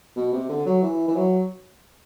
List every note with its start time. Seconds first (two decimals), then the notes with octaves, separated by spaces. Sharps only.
0.16 B2
0.33 C3
0.49 D3
0.66 F#3
0.82 E3
1.08 E3
1.16 F#3